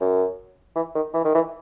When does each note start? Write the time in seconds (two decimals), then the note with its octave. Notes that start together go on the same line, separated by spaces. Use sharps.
0.01 F#2
0.76 E3
0.95 D#3
1.14 E3
1.25 D#3
1.35 E3